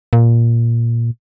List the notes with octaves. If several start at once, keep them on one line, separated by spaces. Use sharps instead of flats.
A#2